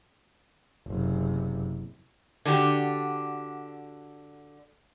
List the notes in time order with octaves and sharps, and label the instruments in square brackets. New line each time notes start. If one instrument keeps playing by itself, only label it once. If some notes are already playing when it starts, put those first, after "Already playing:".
[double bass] F#1 C3
[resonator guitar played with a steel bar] D3 D4 F#4 G4